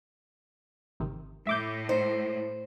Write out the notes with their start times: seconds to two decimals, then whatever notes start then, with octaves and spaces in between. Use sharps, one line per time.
1.00 G#1 C3 D#3
1.47 A2 E5 D6 G6
1.89 D#4 C5